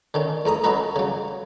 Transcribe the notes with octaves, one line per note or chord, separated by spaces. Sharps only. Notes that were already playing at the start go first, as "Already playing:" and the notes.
D3 D#3 C#4
E2 A3 A#5 D#6
C#4 F#4 A4 B4 D#5 A#5
C#3 F#3